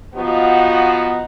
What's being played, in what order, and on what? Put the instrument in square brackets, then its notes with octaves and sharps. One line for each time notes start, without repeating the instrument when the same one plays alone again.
[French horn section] F3 B3 D#4 F4 F#4